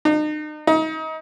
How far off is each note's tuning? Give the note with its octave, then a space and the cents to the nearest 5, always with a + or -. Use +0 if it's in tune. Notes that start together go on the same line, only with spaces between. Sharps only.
D#4 -40
D#4 +30